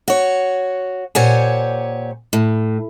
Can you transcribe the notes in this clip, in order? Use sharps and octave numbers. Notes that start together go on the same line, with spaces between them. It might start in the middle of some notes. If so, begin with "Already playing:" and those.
F#4 C#5
A#2 G4 C5 C#5 F#5 G#5
A2